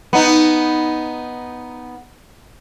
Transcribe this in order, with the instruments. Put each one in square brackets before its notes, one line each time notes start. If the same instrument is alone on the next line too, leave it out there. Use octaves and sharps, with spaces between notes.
[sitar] B3 D#4